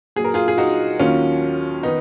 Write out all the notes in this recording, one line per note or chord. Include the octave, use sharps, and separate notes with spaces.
A#2 F#3 G#4
A#4
F4 G#4
G#4
D#4 F#4
D#2 D#3 F#3 C#4 F4
D#3 B3 D#4